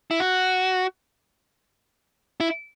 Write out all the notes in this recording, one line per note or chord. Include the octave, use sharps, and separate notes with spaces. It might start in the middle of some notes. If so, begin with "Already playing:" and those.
E4
F#4
E4